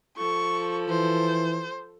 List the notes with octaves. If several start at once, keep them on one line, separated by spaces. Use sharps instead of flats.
F3 A4 C#6
E3 C5